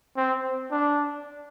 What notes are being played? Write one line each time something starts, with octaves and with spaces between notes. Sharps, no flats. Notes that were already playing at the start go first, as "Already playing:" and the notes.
C4
D4